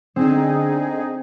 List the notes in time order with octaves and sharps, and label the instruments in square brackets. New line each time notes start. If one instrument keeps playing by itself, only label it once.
[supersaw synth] D3 D#4 G#4 [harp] C4